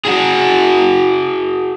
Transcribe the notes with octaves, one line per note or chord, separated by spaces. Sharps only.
F#4 G#4